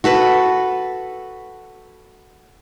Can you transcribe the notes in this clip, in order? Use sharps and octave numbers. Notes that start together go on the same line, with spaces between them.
F#4 A4 B4 B5